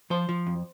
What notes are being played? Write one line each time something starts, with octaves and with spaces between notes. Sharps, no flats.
F3 C5
F3
F2